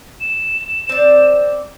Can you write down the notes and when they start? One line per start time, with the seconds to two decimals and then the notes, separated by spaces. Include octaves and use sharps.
0.20 E7
0.89 C4 D5